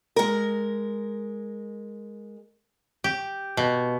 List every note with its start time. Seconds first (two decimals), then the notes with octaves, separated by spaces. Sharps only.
0.16 G#3 A#4
3.04 G4
3.57 B2